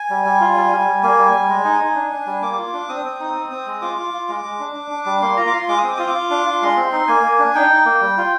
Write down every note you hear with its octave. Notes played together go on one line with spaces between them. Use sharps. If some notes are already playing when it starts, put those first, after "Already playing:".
Already playing: G#5
G3
G3
F4
G3
G3
G3
A#3 G#5
G3
G3
G#3
D#4
D#4
D4
D4
G3
A#3 D6
F4
D4
C4 D#6
C4
D#4
C4
C4
G#3
F4 D6
F4
F4
G#3
G#3
D4
D4
D4
G3
A#3 C6
F4 A#5
D6
F4 C6
G#3 D6
D#6
C4 D6
F4 D#6
D6
F4
D4
F4
G#3 C6
C4
D#4
A#3 G#5
A#3
D4
D#4 G5
D#4
A#3
G3
F4